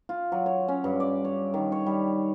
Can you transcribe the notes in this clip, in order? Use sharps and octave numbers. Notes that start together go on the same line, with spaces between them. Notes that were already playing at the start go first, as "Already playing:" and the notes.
F4
F#3
C#5
C#4
G2
D5
C#5
D#3
C#5
G3